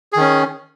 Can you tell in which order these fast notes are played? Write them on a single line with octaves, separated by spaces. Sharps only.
G#4 D#3 C#4